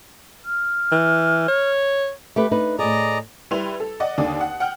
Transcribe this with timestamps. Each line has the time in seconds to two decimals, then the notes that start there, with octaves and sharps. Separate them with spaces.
0.45 F6
0.92 E3
1.48 C#5
2.36 A3 G4 B4
2.51 D4 D#4 B4
2.79 A2 G#4 D5 D#5 A#5
3.51 G3 E4 B4 C6 F7
3.80 A4
4.00 D5 D#5 F#5
4.18 D#2 D3 D5 D#6
4.41 F#5
4.60 F#5 G5 F6